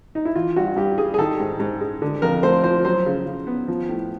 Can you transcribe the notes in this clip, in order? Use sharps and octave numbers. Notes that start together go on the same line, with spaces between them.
D#4
E4
E3 F4
G2 F#4
G2 G4
G3 G#4
G#4
D#3 A4
G#2
G#2
G#3
D3
F2 A#4
A3 C5
F3 C5
F#3 C5
C#3
C#3
B3
F3
A2